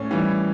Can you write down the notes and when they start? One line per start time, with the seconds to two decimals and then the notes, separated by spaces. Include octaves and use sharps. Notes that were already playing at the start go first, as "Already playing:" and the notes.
Already playing: A2 C#4
0.11 E3 G3